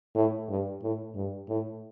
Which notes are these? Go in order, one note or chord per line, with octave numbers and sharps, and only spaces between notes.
A2
G2
A2
G2
A2